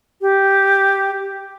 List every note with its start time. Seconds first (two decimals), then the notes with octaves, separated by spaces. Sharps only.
0.21 G4